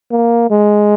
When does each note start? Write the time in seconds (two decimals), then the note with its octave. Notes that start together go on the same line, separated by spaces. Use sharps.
0.11 A#3
0.50 G#3